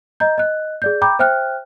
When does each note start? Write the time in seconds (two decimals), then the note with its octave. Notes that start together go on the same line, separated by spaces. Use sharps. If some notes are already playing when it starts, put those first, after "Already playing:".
0.20 D#5 A#5 G6
0.38 D#5 F#6
0.82 G#4 D5 G6
1.02 G5 A#5 B5 D6 G6
1.19 C5 E5 G5 F6 F#6